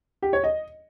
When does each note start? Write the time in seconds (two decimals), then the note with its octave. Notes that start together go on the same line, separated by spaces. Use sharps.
0.22 G4
0.33 C#5
0.44 D#5